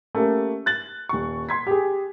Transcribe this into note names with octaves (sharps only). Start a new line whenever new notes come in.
A3 A#3 C#4 G4
F#6 A6 F#7
D#1 C#6
C6 G#6 B6
G4 G#4